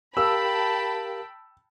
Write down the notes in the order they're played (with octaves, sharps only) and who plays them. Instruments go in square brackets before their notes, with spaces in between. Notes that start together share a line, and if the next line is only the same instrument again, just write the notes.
[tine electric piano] G4 A#4 F5 [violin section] G5 A5 B5 [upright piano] E6